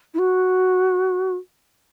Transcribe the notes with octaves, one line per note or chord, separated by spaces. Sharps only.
E4
F#4